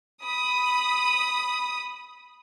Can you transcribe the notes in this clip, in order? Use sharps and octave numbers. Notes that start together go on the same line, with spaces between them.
B5 D#6